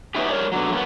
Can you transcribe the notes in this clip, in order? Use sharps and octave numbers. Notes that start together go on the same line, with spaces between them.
B3 C#4 D#4 E4 G4
G3 A#4 C#5 D5
B2 D3 F#3
F#2 A#3 B3